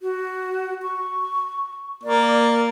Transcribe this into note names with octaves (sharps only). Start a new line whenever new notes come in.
F#4
C#6
A#3 D5